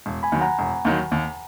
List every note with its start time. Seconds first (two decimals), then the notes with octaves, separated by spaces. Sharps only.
0.06 E1
0.23 G#5 B5
0.32 D#2 D#3 F#3
0.41 F#5 A#5
0.59 E1
0.85 D#2 D#3 F#3
1.11 D#2